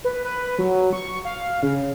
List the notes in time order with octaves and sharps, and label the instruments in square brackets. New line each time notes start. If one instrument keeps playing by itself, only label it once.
[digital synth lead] B4
B4
F#3
C#6
F5
C#3